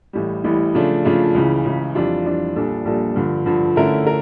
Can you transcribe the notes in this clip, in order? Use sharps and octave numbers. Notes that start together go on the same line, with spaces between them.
A1 A2 E3 G3
A1 A2 E3 G3
C#3 F3 A3 D4 F4
C#3 F3 A3 D4 F4
C#2 C#3 E3
C#2 C#3 E3
F2 E3 G3 D4 F4
F2 E3 G3 D4 F4
A#1 A#2 G3 D4 A4
A#1 A#2 G3 D4 A4
G2 D3 F3
G2 D3 F3
D3 A3 C#4 E4 A#4
A#4